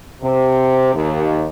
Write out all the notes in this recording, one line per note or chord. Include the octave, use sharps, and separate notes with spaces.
C3
D#2